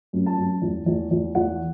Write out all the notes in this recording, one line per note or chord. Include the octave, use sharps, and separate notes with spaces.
F#2
A5
F#2
E2
E2
E2
E2 F#5